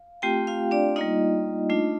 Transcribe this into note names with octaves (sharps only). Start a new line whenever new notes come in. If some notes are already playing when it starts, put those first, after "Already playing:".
Already playing: F5
A3 C4 F4 G4 G5
F4 F5
D4 D5
G3 A#3 D#4 F4 D#5
A3 D4 F4